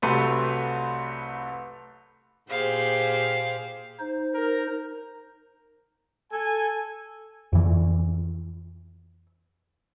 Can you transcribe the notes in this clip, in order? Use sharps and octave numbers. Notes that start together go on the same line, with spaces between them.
C2 F#3 A3 G4 B4 C6
A#2 G4 G#4 C5 F5
D#4 C5
A#4
A4 G#5
F2 E3